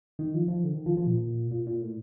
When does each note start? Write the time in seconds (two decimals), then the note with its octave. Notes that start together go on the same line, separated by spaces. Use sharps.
0.19 D#3
0.34 F3
0.48 F3
0.64 D3
0.75 D#3
0.86 F3
0.97 F3
1.07 A#2
1.51 A#2
1.67 A#2
1.81 A2